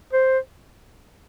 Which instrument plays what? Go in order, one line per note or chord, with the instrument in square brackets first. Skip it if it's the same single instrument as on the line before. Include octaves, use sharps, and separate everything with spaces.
[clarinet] C5